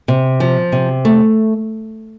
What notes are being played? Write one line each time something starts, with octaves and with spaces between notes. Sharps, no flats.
C3
F3
C3
A3